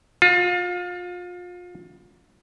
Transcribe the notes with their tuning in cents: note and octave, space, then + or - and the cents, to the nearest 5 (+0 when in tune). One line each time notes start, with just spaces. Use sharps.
F4 +30